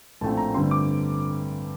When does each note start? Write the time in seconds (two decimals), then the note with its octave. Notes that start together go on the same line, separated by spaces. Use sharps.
0.21 A#1 A2 A3 C4 A5
0.37 A#5
0.54 G2 D3 A3 C4 C6
0.71 D6